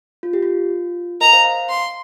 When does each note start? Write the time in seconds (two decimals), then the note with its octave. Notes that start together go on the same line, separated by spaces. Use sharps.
0.23 F4
0.33 G4
0.43 F4
1.21 A#4 D#5 A#5
1.33 C5 F5
1.44 F5 A#5
1.70 C6